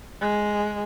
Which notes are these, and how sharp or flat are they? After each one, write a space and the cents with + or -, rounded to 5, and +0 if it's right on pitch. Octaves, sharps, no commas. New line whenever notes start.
G#3 +5